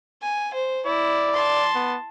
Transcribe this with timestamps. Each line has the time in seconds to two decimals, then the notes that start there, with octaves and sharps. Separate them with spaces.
0.22 G#5
0.54 C5
0.86 E4 D5
1.34 A5 C6
1.75 B3